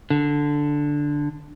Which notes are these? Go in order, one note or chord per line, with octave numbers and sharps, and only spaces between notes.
D3